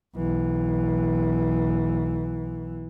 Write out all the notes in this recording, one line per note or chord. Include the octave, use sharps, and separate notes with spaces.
B1 E3